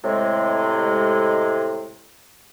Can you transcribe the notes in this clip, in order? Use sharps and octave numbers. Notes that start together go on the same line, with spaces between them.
A2 C3 G#3